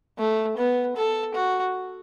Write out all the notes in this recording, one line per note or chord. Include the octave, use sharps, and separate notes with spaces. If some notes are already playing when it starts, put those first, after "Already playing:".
A3
B3
A4
F#4